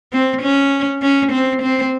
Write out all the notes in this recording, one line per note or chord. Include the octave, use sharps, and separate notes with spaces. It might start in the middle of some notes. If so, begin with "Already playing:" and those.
C4
C#4
C#4
C4
C4